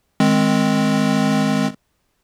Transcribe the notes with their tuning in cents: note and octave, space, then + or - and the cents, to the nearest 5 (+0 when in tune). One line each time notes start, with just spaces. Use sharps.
D#3 +0 G#3 +0 C4 +0